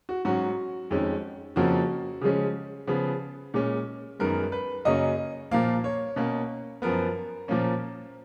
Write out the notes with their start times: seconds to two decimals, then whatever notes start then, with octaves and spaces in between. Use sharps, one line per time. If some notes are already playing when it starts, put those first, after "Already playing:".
0.09 F#4
0.25 G#2 F#3 C#4 F#4
0.91 F2 D#3 G#3 C#4
1.56 F2 C#3 F3 A#3 C#4 F#4
2.21 C#3 F3 G#3 C#4
2.87 C#3 F3 B3
3.54 A#2 G#3 C#4
4.19 F#2 D#3 G#3 B3 A#4
4.52 B4
4.85 F#2 C#3 F#3 A#3 C#4 D#5
5.51 A#2 F3 A#3 F5
5.84 C#5
6.16 B2 A#3 C#4
6.82 F#2 F3 B3 A#4
7.48 A#2 F3 A#3 C#4